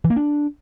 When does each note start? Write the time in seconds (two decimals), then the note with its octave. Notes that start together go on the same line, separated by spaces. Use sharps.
0.04 E3
0.10 A#3
0.16 D4